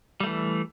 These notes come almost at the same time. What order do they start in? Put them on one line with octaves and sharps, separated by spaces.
G3 A3 E3